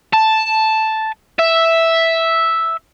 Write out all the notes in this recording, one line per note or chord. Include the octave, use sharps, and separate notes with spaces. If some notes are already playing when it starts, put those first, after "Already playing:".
A5
E5